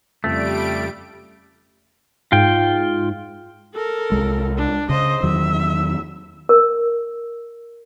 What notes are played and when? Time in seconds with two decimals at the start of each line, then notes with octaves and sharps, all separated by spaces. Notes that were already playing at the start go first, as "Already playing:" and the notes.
0.24 F2 C#3 G3 A3 D7
2.32 G#2 F4 G5
3.75 A4 A#4
4.12 C2 G#3
4.57 D4
4.89 C#3 C5 D#5
5.23 E2 D#3 F#3 E5
6.49 A#4